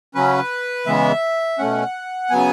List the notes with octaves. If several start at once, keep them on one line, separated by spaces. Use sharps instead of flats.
C#3 F#3 C#4 B4
C#3 E3 G#3 B3 E5
B2 A3 C#4 F#5
C#3 F#3 B3 G#5